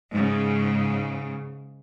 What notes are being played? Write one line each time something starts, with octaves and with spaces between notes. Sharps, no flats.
G#2 C#3